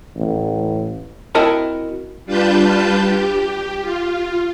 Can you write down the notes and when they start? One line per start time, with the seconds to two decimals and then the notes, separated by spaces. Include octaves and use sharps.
0.16 A1
1.35 C4 E4 F#4 A#4 D#5 A5
2.26 G3 D4 F4 B4 A5 G6
3.01 G4
3.82 F4